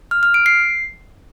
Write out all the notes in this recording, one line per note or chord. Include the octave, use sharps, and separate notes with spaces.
F6
F6
D7
C7